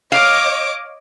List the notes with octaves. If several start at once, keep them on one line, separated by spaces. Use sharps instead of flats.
C#5 D#5 F5 D6